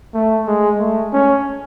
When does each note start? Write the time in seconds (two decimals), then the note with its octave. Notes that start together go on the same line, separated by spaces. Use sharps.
0.14 A3
0.47 G#3
0.79 A3
1.13 C#4